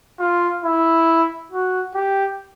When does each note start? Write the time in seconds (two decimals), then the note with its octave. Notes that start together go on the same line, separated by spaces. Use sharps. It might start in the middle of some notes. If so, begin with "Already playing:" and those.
0.19 F4
0.64 E4
1.51 F#4
1.95 G4